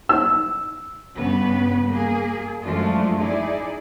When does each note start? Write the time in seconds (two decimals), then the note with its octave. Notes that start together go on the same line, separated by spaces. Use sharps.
0.09 E6
1.17 G2 C#3 B3 B4
1.90 A#3 G#4
2.63 F#2 F3 G#3 A3 D4 F4
3.19 D#4 E4 G#4 D5